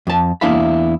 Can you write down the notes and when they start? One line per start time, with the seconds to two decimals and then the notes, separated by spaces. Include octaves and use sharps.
0.07 F2 A5
0.41 E2 A#3 D4 E4 F5 B5